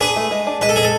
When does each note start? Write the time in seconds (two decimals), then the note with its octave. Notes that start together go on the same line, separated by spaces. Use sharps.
0.01 D4 G#4 B4
0.16 A3
0.31 G#3
0.47 D4
0.61 G#3 B4
0.69 A4
0.76 G#3 G#4
0.83 A4